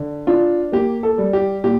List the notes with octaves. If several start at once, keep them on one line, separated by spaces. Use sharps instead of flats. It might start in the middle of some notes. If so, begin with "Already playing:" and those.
Already playing: D3
D4 F4
A#3 G4
A4
G3
G4
A#2 G4